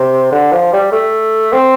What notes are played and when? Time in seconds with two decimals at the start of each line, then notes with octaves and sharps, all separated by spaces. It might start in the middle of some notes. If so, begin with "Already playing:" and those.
Already playing: C3
0.32 D3
0.52 F3
0.73 G3
0.92 A3
1.53 C4